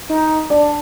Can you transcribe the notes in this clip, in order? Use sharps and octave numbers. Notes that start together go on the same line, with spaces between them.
D#4
D4 D5